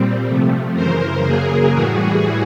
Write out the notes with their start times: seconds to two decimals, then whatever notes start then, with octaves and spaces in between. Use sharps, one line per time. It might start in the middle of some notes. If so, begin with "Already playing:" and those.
Already playing: A#2 G3 C4
0.25 C3 F3 A3
0.73 F#2 C#3 E3 A#4 C5
1.23 F#2 C#3 F#3 A#3 G#4 A#4
1.72 A2 E3 G3 F#4 G#4